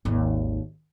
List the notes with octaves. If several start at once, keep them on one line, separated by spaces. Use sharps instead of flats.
G#1 D#2